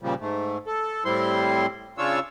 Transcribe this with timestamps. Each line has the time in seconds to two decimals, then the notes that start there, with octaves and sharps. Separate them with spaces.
0.01 A#2 C#3 F3 G3
0.20 G#2 A3
0.67 A4
1.05 A2 G3 C4 E4 C6
1.98 C#3 D4 F4 C#5 E6